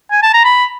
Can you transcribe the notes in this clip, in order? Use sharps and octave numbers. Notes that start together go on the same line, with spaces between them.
G#5
A5
A#5
B5